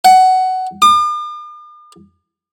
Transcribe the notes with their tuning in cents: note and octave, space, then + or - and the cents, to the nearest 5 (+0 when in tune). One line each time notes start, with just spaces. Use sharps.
F#5 +15
D6 +45